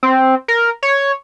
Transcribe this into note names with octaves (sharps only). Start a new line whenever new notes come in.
C4
A#4
C#5